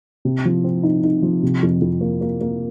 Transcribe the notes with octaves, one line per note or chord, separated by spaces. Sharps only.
C3
F3
C4
D#4
D#4
F3
C3
F2
F2
A#3
A#3
A#3